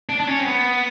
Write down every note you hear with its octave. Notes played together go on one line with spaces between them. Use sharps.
D4
D4
C#4
C4
B3